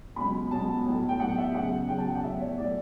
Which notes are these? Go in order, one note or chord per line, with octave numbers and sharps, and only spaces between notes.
C#2 B2 F#3 B5
C#2 B2 F#3 A5
B1 A2 F#3
G5
B1 A2 F#3 F#5
E5
E2 C#3 F#3 F#5
E2 C#3 F#3 G5
A5
G5
F#5
B1 A2 F#3 E5
C#5
A2 F#3 D5